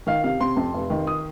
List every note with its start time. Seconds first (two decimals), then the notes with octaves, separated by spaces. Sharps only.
0.07 D#3 F5
0.24 C3 F5
0.40 C3 C6
0.56 F2
0.74 F1
0.90 D#3
1.07 D#6